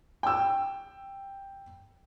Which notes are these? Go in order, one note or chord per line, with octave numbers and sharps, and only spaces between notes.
G5 E6